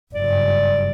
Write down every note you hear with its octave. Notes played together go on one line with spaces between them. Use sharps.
F#1 G2 D5